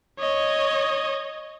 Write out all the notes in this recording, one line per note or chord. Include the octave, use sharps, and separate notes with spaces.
C#5 D#5